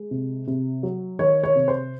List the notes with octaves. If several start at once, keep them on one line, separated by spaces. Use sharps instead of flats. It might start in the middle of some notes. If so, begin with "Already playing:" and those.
Already playing: G#3
C3
C3
F#3
D#3 C#5
C#5
C3
C5